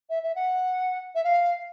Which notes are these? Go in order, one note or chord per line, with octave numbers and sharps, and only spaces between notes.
E5
E5
F#5
E5
F5